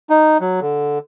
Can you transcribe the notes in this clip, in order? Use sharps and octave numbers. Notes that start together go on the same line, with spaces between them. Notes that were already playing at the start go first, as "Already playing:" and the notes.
D#4
F#3
D3